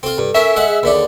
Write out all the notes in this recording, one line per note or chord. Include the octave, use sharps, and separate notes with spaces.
C4 F4 A4
G2
C#4 A#4 E5
G#3 F#5
G#4
D#2 D3 D4